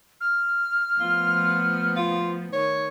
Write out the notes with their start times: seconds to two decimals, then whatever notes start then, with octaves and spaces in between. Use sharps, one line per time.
0.21 F6
1.00 F3 A3 B3 F4
1.97 F4
2.53 D#3 C#5